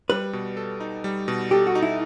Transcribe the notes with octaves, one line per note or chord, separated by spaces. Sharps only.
G3 B4
B2
A4
D#4
G3
B2
G4 A4
F#4
D#4
E4